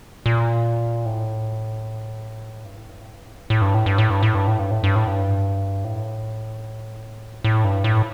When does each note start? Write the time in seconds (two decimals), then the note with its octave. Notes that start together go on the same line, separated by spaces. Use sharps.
0.26 A#2
1.06 A2
2.65 G2
2.77 A2
2.89 G2
3.01 A2
3.13 G2
3.26 A2
3.38 G2
3.50 A2
3.62 G2
3.74 A2
3.86 G2
3.98 A2
4.10 G2
4.23 A2
4.35 G2
4.47 A2
4.59 G2
4.71 A2
4.84 G2
4.96 A2
5.07 G2
5.84 A2
7.44 A2
7.64 G2
7.84 A2